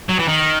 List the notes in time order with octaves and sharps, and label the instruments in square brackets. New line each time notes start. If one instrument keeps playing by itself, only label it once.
[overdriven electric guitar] F#3
E3
D#3